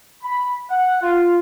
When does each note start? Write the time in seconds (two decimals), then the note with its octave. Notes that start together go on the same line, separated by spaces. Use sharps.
0.24 B5
0.71 F#5
1.02 F4